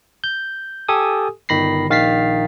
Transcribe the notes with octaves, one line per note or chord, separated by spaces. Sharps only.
G6
G4 A4 G#5 D#6
G1 D#3 B5 A#6 C7
A#1 D#3 F5 A6 B6 C7